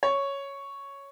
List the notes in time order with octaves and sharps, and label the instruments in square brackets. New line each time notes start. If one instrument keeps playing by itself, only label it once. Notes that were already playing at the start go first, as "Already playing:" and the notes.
[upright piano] C#5